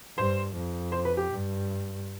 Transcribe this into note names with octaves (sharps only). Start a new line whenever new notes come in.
G2 C5
F2
C5
B4
G4
G2